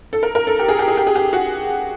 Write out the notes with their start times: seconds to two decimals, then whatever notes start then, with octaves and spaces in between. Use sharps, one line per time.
0.13 A4
0.23 A#4
0.35 A#4
0.47 A4
0.59 G4
0.68 G#4
0.79 G4
0.88 G#4
0.97 G4
1.07 G#4
1.15 G4
1.33 F#4